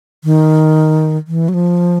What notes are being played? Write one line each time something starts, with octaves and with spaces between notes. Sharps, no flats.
D#3
E3
F#3
F3